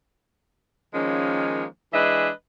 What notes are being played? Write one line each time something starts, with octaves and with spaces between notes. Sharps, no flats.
D#3 F3 G#3 A#3 C#4
E3 G#3 D4 B4 D#5 E5